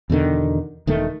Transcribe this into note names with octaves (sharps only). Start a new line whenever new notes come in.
E2 B2 D3 D#3
E1 D#3 A3